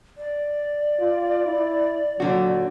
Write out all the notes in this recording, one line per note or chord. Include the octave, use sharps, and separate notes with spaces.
D5
F4
E4
A#2 D3 F#3 F#4